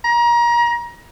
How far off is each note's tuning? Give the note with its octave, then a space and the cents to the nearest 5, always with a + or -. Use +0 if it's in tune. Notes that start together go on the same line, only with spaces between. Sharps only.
A#5 +30